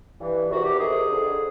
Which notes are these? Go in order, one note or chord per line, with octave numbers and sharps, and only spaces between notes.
G2 E3
E2 C3 D#3 F#4
G4
F2 C3 D#3 G#4
F2 D3